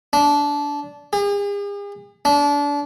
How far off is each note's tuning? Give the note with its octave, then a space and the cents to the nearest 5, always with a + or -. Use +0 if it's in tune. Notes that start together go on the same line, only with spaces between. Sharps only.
D4 -20
G#4 -45
D4 -30